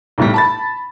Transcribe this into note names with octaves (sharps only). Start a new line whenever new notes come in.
B1 A2 G3
A5 B5 A6